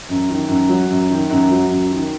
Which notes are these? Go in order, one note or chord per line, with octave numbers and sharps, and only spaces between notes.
F#2
D#3
F#2
F#3
F#2
D#3
F#2
F#3
F#2
D#3